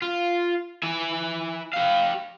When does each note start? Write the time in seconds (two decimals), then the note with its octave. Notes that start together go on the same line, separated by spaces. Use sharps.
0.02 F4
0.83 E4 G#5
1.74 G4 F5